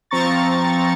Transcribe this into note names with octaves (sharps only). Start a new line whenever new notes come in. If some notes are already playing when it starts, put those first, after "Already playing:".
F3 C4 A#5 C#6 A6